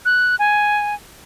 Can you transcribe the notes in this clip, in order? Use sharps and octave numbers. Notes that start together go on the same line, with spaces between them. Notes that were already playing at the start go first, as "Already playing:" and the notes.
F#6
G#5